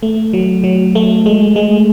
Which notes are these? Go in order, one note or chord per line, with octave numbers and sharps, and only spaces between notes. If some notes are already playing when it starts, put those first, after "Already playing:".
A3
F#3
F#3
A3
G#3
G#3